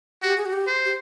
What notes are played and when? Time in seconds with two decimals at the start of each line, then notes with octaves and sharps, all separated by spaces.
0.22 F#4 G4
0.37 G#4
0.46 F#4
0.53 G4
0.67 C5
0.85 G4